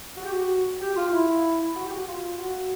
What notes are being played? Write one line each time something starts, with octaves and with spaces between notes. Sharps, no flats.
F#4
G4
F#4
G4
F4
E4
F#4
G4
F#4
F4
F#4